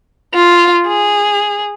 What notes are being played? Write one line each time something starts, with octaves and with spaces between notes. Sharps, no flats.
F4
G#4